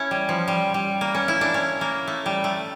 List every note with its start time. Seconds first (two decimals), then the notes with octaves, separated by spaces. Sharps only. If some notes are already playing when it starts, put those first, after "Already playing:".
Already playing: C#4 E4
0.11 G3
0.29 F3
0.48 G3
0.74 G3
1.01 A#3
1.15 C#4
1.28 E4
1.41 D4
1.54 C#4
1.81 A#3
2.07 A3
2.26 G3
2.44 A3